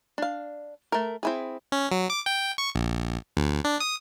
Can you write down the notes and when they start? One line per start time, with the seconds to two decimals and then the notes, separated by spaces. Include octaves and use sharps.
0.18 D4 F5
0.92 A3 A#4
1.23 C4 E4 G#4
1.72 C#4
1.91 F#3
2.10 D6
2.26 G5
2.58 C#6
2.75 A#1
3.37 D2
3.65 D4
3.80 D#6